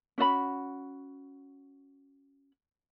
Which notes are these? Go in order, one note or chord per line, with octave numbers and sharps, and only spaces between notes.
C#4 F#4 D#5 B5